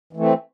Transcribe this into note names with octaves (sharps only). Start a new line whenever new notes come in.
E3 A3 C4